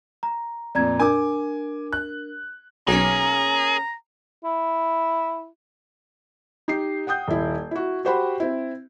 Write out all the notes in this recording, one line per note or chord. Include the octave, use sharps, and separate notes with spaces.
A#5
F2 A#2 D5 A#5 G#6
D4 A#4 G#5 D6
F#6
B1 A#3 C#4 G#4 A#5
E4
D#4 G4 C7
F#5 G5 D#6 G6
D#1 E4
E4 F#4
F#4 G4 C5 F#5 G5 B5
C4 E4